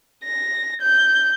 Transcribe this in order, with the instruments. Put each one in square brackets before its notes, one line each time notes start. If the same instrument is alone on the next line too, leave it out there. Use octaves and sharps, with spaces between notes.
[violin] A#6
G6